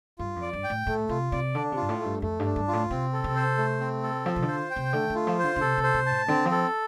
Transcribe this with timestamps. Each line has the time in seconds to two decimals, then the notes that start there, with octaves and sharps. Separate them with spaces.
0.19 G2 F4
0.36 F2
0.42 D5
0.53 G2
0.64 G5
0.70 A2
0.87 A2 A3
1.09 C3 F4
1.32 C3 D5
1.55 D3 D4
1.72 C3 F4
1.82 G2
1.89 A2
2.00 A3
2.05 G2
2.22 F2 A3
2.39 G2
2.45 D4
2.56 G2
2.68 F4
2.73 A2
2.90 C3 C4
3.13 A4
3.24 C3
3.36 C5
3.58 A3
3.80 C4
4.03 A4
4.25 F3 F4
4.36 C3
4.42 D3
4.48 C5
4.70 G5
4.76 C3
4.93 D3 A3
5.10 D3
5.15 F4
5.27 F3
5.39 C5
5.44 D3
5.56 D3
5.61 C3 A4
5.78 C3
5.83 C5
5.94 C3
6.06 A2 A5
6.28 D3 C4
6.45 F3
6.51 A4